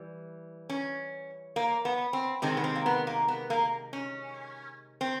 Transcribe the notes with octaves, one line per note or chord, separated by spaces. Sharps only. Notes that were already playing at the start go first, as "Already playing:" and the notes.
Already playing: E3 G3
C#4
A#3
B3
C4
C3 D#3 G#3 C4
B3
C4
A#3
B3
A#3
B3
A#3
C#4
C4